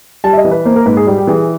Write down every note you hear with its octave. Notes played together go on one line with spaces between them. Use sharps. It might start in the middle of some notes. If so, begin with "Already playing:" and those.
G3 A5
E5
D#5
E3
B4
A#3 C5
A#4
G#2 B4
G#4
G3 G4
G4
E3 G#4